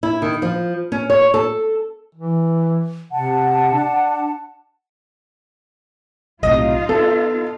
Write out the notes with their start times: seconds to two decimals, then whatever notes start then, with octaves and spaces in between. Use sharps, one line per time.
0.03 E4
0.22 D#3
0.42 F3
0.92 C#4
1.10 C#5
1.34 A4
2.15 E3
3.12 C3 F#5 A5
3.73 D4
6.43 B1 A2 C3 D#4 F4 D#5 F5
6.89 B3 A4